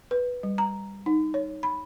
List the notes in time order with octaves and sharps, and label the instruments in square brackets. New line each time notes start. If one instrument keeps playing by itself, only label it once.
[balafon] B4
G3
A#5
D#4
C#5
B5